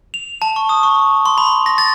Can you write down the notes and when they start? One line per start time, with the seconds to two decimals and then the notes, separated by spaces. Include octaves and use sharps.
0.14 F7
0.42 A5
0.56 C#6
0.69 D#6
0.83 C#6
1.26 C6
1.38 B5
1.66 A#6
1.78 A6